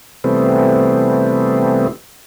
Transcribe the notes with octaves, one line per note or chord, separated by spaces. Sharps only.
C3 E3 G3 A3 B3 C4